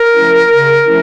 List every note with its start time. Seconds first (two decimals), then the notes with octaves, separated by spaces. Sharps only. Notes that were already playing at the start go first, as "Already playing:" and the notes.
Already playing: A#4
0.14 F3 A3 C#4 E4
0.49 C#3
0.84 F3 A3 C#4 E4